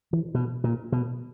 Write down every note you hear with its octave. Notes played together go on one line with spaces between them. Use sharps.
E3
B2
A#2
B2